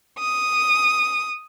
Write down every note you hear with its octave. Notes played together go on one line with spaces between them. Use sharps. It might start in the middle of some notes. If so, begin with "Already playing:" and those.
D#6